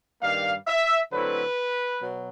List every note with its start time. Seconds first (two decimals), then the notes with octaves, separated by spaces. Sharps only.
0.21 G2 D#3 G3 A#3 F5
0.67 E5
1.11 D3 F#3 A3 C4 E4 B4
2.01 B2 F#3